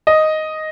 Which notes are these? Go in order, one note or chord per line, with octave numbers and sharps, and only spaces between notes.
D#5